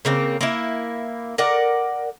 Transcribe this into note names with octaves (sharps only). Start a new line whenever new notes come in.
C#3 A#3 C4
A#3 E4
A#4 D5 F#5